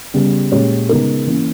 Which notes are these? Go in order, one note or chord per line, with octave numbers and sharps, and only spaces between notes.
C#3 G3 B3
A#2 G#3 C#4 G4 C#5
C#3 G#3 B3 D#4 A#4
E3 A#3 C#4